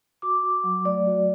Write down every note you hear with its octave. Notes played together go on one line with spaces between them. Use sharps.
F#4 D6
F#4
F#3
A3 D5
F#4